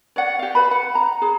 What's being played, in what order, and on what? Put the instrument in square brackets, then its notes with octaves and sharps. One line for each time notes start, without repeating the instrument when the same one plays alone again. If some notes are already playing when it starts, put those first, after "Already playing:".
[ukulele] C#5 D5 F#5
G4 F5
B4 B5
F#5
A#5
G#4